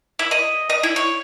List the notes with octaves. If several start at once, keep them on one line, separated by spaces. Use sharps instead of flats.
E4
D#5
D#5
E4
C#5